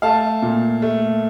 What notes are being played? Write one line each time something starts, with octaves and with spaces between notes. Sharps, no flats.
A3 F5 A5
A#2
A3